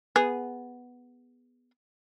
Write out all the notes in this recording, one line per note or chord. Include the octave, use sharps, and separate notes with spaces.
B3 G#4